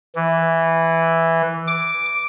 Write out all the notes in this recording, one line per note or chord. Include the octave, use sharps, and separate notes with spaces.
E3
D6